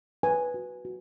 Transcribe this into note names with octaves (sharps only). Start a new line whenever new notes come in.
B4 G#5
F#4
F#4